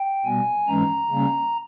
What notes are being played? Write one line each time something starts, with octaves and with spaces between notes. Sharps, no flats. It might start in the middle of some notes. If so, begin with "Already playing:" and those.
Already playing: G5
B2 G3 B3 G#5
G#2 E3 G#3 C#4 A#5
C#3 G3 A#3 C#4